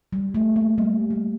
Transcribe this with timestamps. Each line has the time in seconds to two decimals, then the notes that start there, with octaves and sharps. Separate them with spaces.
0.13 G3
0.34 A3
0.56 A#3
0.78 G3
1.10 G3